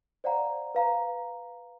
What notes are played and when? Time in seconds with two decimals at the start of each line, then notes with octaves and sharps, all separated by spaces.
0.24 C5 D5 F5 F#5 A#5
0.75 B4 F5 A#5